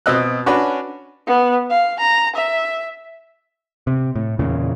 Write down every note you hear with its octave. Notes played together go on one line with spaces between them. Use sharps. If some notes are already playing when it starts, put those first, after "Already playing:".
B2 C4 D#5 E6 F#6
C#4 D4 F#4 B4
B3
F5
A#5
E5
C3
A2
E2 A#2 C#3